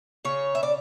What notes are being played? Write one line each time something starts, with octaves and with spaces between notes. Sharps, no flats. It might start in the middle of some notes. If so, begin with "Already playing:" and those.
C#3 C#5
E5
D5